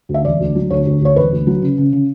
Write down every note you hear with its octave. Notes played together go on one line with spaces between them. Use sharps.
D2
E5
E1 D5
D2
F#3
D2 C#5
D2
D2 C#5
E1 B4
D2
F#3
C#3
C#3
C#3